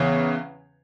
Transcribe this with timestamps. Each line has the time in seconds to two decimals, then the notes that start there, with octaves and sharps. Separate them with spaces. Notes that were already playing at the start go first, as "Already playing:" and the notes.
Already playing: E2 C#3 E3 C#5